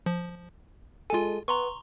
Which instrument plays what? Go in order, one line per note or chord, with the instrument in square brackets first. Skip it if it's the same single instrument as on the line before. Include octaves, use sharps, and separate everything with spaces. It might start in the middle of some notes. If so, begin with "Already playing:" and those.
[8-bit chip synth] F3
[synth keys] G#3 A4 [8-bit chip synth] F4 G#5
[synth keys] B3 [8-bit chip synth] A#5 C6 C#6